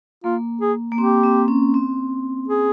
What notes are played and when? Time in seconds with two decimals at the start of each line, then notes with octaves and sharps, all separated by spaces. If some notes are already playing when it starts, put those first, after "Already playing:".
0.24 A#3 F4
0.61 G#4
0.92 A#3
0.98 C4 G4
1.24 C4
1.48 C#4
1.74 C4
2.48 G#4